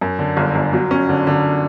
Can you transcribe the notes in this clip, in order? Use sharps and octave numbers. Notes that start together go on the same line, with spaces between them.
F#2
D3
G1
G1
F#3
C#4
D3
D3